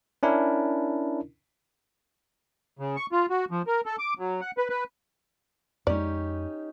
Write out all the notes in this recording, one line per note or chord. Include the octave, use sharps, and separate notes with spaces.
C#4 D4 E4 A#4
C#3
C#6
F4
F#4
F3
A#4
A4
D6
F#3
F#5
B4
B4
F2 G#3 C#4 D#4 G4 D5